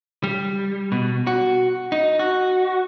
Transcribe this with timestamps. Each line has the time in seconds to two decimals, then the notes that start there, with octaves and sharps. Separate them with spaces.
0.24 G3
0.92 B2
1.27 F#4
1.92 D#4
2.19 F#4